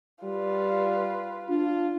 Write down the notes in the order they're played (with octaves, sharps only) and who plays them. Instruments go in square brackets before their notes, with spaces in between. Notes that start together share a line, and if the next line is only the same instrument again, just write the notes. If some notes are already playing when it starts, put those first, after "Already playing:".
[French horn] G3 [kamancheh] F4 B4
[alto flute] D4 [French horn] F4